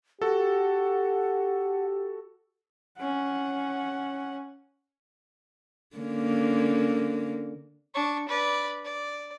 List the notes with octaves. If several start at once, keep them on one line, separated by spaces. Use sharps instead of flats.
F#4 G4 A4 F#5
C#4 F#5
D3 A#3 C#4
D4 C#6
B4 D5
D5